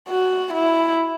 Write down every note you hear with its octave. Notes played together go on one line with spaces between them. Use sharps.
F#4
E4